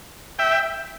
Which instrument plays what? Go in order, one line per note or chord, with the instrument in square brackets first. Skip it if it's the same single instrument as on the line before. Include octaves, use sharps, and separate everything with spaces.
[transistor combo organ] E5 G5